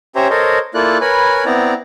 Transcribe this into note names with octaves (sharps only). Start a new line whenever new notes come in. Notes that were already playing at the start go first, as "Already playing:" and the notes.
C#4 G4 C5 C#5 E5 A#5
A4 A#4 C5 C#5 D#5
A#3 E4 F4 A4 D5 F#6
A#4 B4 C#5 G#5 B5
B3 C4 E4 D5 A#5